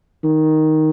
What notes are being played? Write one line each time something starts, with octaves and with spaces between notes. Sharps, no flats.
D#3